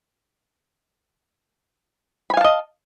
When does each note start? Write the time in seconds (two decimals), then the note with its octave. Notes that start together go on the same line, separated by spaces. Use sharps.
2.30 B5
2.34 G#5
2.37 F5
2.41 A5
2.44 D#5